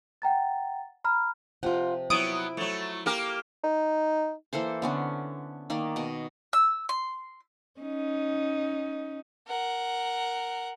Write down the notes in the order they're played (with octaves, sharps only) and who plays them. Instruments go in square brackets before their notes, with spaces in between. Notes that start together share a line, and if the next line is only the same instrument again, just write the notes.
[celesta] F#5 G5 A#5 A6
A#5 B5 F6
[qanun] C3 F3 [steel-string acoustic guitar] F4 F#5
[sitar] F#3 B3 [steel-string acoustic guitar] E4 [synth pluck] D#6 D7
[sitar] F#3 A3 [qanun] C#5
[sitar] A#3 G4 A#4
[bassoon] D#4
[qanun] E3 A#3 A4 C5
D3 B3 C#4
D#3 A#3 D5
B2 D#5
[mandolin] E6
C6
[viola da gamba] C#4 D#4
[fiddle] A#4 F#5